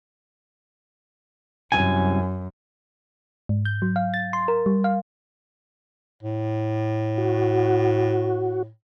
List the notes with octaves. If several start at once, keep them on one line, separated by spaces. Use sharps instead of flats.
C2 F#2 D#3 G#5
G#2
G6
F#3
F5
A6
C6
A#4
G3
F5
A2
F#4